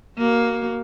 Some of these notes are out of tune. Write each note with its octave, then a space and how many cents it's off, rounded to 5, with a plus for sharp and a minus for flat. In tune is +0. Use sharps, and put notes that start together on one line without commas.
A#3 +5 F#4 +25